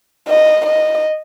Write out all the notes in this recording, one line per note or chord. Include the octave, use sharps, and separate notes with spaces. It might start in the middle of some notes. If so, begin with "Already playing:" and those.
D#5
D#5